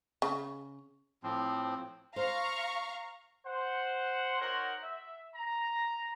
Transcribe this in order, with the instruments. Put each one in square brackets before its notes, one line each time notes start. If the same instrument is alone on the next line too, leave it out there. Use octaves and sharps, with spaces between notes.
[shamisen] C#3
[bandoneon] A2 F3 C4
[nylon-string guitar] C5 [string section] F5 A#5 C#6
[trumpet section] C5 F#5
D#4 F#4 A#4 C5 C#5 F#5
E5
A#5